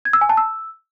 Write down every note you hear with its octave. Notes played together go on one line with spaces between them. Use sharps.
G#6
E6
G#5
A5
E6